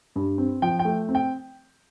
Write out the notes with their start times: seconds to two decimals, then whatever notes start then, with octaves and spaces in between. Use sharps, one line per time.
0.16 G2
0.38 C4
0.62 F3 G5
0.79 G5
0.85 A3
1.09 C4
1.15 G5